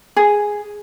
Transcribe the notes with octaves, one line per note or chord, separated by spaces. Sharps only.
G#4